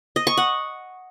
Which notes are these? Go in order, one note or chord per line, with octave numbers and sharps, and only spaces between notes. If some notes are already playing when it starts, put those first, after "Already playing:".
D#5
C#6
F#5